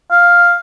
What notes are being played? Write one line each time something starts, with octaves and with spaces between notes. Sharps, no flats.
F5